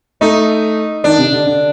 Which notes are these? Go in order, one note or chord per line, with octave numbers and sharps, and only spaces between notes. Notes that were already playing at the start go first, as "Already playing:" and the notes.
A3 D#4
D#3 D4
C3
D3
D3